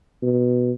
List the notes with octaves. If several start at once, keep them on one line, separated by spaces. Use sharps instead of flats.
B2